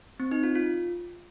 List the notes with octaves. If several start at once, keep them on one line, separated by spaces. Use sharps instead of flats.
C4
D#4
F4
F4